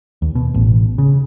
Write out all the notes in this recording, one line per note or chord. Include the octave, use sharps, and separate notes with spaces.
D#2
B2
A1
C#3